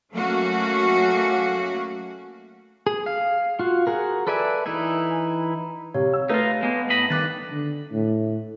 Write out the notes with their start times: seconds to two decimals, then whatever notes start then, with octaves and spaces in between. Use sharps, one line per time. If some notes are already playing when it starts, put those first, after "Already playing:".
0.13 F#3 A3 A#3 C#4 F#4
2.87 G#4
3.06 F5
3.59 F4 F#4
3.87 F#4 G#4 A#4
4.27 A4 B4 D5 E5 G#5
4.66 E3 D#4 E4 G#5
5.94 C3 C#5 F5
6.13 E6
6.29 A3 D#4 F4 B4 F5 A#6
6.63 G#3 A#3 B3
6.90 A2 D#5 B5
7.10 G2 D#3 D6 F#6 A6
7.51 D3
7.91 A2